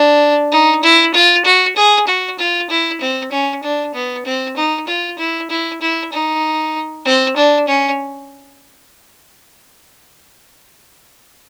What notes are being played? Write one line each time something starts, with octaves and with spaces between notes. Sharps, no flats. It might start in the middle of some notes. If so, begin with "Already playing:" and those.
Already playing: D4
D#4
E4
F4
F#4
G#4
F#4
F4
E4
C4
C#4
D4
B3
C4
D#4
F4
E4
E4
E4
D#4
C4
D4
C#4